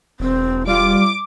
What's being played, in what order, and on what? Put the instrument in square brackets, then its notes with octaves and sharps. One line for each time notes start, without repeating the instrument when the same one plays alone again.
[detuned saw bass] E1 [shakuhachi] C4
[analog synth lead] G3 [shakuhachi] F4 [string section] D6